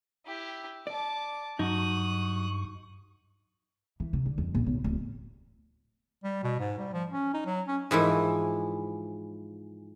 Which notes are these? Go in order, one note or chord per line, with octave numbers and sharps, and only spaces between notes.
E4 G4
D5 A5 D6
G2 F#3 D#4 F#4 C#6 D#6 F#6
E3
C3
D3
F2
A#1
B1
D1
G3
B2
G#2
G3
F3
C#4
D#4
F#3
C#4
G#2 E3 F3 E4